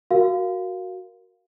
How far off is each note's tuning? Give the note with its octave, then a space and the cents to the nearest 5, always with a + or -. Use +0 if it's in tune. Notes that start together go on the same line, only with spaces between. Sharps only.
F#4 +0 A#4 +0 F5 +0